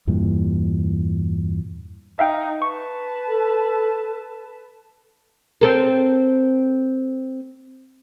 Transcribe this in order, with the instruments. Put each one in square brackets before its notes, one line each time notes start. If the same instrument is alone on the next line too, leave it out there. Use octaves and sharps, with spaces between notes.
[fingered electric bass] E2 G2 A#2 E3
[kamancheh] D#4 [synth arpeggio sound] E5 F5 G5
[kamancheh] B4 A5 [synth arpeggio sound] C#6
[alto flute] A4
[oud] C4 A4 A#4